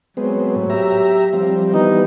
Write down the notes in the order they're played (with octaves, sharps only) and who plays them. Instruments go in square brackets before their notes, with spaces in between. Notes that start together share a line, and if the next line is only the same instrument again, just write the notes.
[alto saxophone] F#3 [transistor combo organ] G#3 B3 C4
[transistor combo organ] A2
G4 E5 A#5
F3 G3 C4
[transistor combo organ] E3 G3 B3 [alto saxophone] D#4